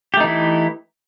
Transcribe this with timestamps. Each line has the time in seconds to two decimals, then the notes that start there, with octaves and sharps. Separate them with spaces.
0.14 G4
0.17 A3
0.20 D#4
0.24 E3
0.27 E4